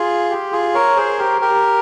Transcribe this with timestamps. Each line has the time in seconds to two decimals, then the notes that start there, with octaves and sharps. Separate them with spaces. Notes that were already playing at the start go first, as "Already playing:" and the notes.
Already playing: F4 G#4
0.30 G4
0.52 F4 G#4
0.74 A#4 C#5
0.97 G#4 C5
1.19 G4 A#4
1.41 G4 A#4